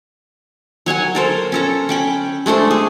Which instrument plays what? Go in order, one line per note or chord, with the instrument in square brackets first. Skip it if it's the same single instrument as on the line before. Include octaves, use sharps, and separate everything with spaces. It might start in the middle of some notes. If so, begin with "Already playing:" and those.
[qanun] F#3 C#5 F#5 G#5
A4 A#4 C5
C#4 A4 A#5
C#4 G5 B5
G#3 A3 D4 C5
G#4